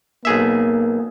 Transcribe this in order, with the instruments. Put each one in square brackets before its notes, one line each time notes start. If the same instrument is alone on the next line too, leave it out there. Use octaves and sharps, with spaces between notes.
[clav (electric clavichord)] B1 G#4 E5 [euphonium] A#3